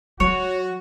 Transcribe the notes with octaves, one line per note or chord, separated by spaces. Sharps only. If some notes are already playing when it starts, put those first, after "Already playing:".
F#3 F#4 C#5